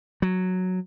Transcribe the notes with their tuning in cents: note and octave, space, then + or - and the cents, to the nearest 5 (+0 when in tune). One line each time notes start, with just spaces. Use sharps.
F#3 -5